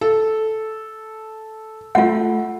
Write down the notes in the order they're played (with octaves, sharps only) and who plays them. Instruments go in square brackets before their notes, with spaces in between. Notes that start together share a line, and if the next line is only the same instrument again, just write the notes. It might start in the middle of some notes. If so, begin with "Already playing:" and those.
[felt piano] A4
[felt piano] A3 [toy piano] F4 F#5